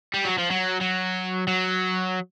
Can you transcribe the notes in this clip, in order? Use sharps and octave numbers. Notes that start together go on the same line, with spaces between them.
G3
F#3
F3
F#3
F#3
F#3